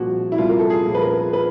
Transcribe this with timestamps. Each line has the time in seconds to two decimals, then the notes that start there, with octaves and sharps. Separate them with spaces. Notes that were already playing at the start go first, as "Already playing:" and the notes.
Already playing: C2 A#2 F3 F#4
0.32 E4
0.38 C2 F4
0.49 A#4
0.59 A4
0.70 G#4
0.86 A#2 F3
0.95 B4
1.02 A#4
1.33 B4